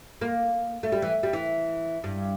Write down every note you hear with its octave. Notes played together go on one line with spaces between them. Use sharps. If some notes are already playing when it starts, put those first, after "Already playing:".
A#3
A3
G3
E3
G3
E3
G2